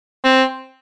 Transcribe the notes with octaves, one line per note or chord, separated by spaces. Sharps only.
C4